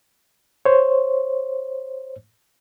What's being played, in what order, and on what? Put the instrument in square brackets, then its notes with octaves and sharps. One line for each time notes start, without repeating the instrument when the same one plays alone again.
[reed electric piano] C5 C#5